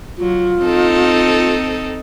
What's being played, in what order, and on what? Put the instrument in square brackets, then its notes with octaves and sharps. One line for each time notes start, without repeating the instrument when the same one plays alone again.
[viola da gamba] F#3 [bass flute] F4
[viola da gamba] C4 D#4 A4